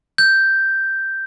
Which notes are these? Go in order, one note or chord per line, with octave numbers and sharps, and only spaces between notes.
G6